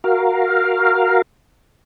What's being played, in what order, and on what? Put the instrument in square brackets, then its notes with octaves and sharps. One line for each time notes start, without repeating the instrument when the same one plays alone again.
[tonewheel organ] F#4 A#4 F5